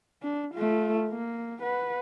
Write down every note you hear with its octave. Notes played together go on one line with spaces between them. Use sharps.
D4
A3 F4
A#3
B4 F#5